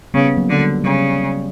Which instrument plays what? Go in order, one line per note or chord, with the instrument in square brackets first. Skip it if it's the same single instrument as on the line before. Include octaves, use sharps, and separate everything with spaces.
[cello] C#3 [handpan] G3 B3
[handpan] F#3 A#3
[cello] D3
[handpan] G3
[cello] C#3 [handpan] G3